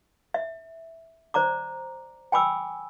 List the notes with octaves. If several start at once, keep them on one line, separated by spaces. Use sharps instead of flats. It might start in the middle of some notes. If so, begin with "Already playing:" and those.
E5
C5 D5 A#5 D6
G5 G#5 B5 D6 E6